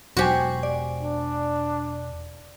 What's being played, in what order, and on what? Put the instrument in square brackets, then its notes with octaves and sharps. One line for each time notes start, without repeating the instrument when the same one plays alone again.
[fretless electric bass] E1 [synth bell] F#3 C5 G#5 [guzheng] F#4 G4
[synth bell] D5
[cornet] D4